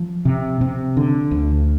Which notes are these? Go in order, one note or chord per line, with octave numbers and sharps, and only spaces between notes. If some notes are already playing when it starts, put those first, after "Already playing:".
Already playing: F3
C3
C3
D3
D2